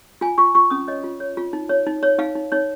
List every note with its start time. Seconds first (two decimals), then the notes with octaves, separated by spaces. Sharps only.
0.21 F4 G#5
0.38 F4 C#6
0.55 F4 C#6
0.70 C#4 D#6
0.88 C#5 D#5
1.04 F4
1.20 C#5
1.37 F4
1.53 D#4
1.69 C#5
1.87 D#4
2.03 C#5
2.19 D#4 F5
2.35 D#4
2.52 D#4 C#5